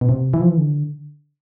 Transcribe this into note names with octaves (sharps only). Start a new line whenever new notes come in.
B2
C3
E3
F3
E3
D3